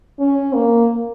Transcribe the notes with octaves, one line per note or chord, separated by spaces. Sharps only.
C#4
A#3